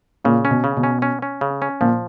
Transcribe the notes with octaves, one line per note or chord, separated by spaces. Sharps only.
A#2 C#3
C#4
B2
C#3
B2
C#4
C#4
C#4
C#3
C#4
A#2 F3